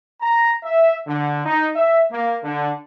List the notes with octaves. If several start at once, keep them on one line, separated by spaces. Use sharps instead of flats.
A#5
E5
D3
D#4
E5
A#3
D3